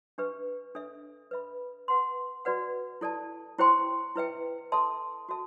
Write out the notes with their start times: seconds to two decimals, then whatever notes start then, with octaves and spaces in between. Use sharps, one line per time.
0.18 D4 G4 B4 E5
0.75 D4 A4 E5
1.31 B4 E5 B5
1.88 B4 F#5 C6
2.45 F#4 B4 D5 F#5
3.01 E4 A4 D5 A5
3.58 E4 G4 C5 G5 C6
4.16 E4 B4 E5 G5
4.72 A4 E5 A5 C6
5.29 F#4 A4 E5 A5